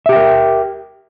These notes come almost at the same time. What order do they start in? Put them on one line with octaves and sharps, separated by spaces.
E5 G4 G5 A#4